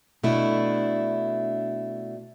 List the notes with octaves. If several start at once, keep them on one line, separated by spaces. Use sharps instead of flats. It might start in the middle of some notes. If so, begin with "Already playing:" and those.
B2 A3 D4 E4